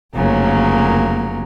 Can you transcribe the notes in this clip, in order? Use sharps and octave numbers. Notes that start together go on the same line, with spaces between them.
F1 C#3 F#3 A#3 A#4